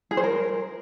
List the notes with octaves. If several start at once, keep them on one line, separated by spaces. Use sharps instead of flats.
G#4
C5
A#4